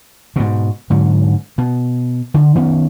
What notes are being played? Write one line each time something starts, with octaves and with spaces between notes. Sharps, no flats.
G#2 B2
G#2 D3 F#3
B2
D3
D#3 B3 C#4